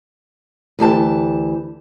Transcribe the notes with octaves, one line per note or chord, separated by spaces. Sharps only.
D2 E3 G4 A5